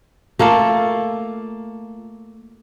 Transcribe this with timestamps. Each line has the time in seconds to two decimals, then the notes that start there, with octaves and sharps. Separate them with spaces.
0.39 A3 A#3 F4 A4